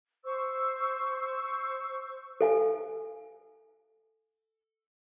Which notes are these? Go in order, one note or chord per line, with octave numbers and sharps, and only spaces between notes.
C5 C#6 E6
A4 F5 G#5